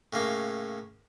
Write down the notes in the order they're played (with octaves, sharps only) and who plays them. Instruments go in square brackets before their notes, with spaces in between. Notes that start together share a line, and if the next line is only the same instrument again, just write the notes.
[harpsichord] A2 C#3 A#3